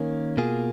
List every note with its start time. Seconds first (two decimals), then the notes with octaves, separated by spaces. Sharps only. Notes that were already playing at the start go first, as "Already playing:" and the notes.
Already playing: D#3 A#3 C#4
0.37 B2 A#3 F4 G#4